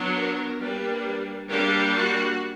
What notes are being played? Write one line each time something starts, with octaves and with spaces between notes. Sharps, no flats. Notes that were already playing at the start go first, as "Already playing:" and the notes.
Already playing: F#3 B3 D4
A#4
G3 A#3 D4 B4
G3 A#3 D4 G4
F#4